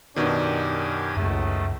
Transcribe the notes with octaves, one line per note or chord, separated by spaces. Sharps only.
F#2 B2 D#3 D4 G4 G#6
C#2 F#2 C#3 A3